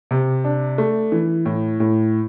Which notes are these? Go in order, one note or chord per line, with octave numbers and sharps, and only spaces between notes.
C3
D4
A3
E3
A2
A2